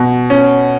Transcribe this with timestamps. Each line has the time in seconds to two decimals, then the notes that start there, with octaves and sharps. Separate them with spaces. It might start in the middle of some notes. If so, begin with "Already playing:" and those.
Already playing: B2
0.30 C#4